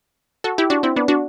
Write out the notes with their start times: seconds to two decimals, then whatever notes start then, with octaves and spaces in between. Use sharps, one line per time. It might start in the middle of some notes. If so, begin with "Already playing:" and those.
0.44 F#4 A4
0.58 E4 G4
0.70 D4 F#4
0.83 C4 E4
0.96 B3 D4
1.08 D4 F#4